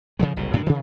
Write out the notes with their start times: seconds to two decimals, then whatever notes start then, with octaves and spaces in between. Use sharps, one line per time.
0.19 A2 C#3 F3 G#3
0.36 F#1 C2 A2
0.53 F#2 A2 C3 D4
0.66 C3 D#3